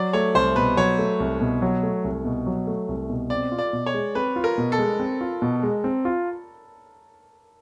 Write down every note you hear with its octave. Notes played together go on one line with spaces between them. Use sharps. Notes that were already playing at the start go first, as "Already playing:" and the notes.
Already playing: F#3 D5
A3 C#5
C2 C5
B2 B4
F#3 C#5
A3
C2
B2
F#3
A3
C2
B2
F#3
A3
C2
B2
C4 D5
F4
D5
B2
C#5
G#3
C4 B4
F4
A#4
B2
A4
G#3
C4
F4
B2
G#3
C4
F4